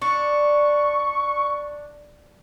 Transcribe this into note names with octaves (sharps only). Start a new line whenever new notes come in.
D4 C#6